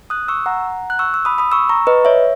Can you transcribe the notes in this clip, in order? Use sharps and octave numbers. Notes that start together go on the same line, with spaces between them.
D#6 F#6
C#6 E6
F#5 A#5
F#6
C#6 E6
E6
B5 D#6
B5 D#6
C#6 E6
A#5 C#6
B4 D#5
C#5 E5